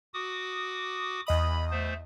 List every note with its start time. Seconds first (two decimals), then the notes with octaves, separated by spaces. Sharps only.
0.14 F#4 D6 D#6
1.27 E2 D#5 B5 D#6
1.71 A3 C5